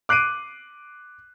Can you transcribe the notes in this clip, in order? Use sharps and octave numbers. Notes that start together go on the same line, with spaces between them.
D6 F#6 C7 D7 D#7